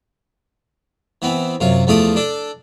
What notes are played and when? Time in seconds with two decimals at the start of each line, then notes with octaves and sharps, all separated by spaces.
1.22 E3 B3 C4
1.60 F#2 C3 F4
1.87 E2 F3 A3 F4 D5 D#6
2.16 D4 A4 D5